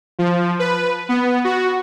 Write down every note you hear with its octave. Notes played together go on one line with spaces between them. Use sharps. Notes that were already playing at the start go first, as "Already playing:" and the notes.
F3
B4
B3
F#4